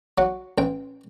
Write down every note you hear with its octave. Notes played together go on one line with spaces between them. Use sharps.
F#3 F#5
A1 G5